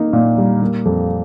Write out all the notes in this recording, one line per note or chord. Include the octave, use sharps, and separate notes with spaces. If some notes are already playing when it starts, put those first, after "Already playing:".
Already playing: A#3 D#4
A#2
G3
A#3
F2